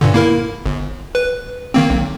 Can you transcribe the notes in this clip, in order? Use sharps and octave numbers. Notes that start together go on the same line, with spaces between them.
G2 A#2 D3
A#3 E4 A#4
G1
B4
D#3 A#3 C4
B1